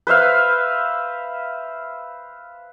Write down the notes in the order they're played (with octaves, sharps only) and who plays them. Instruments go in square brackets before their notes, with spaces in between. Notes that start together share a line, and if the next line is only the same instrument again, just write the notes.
[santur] B4 C5 E5 F5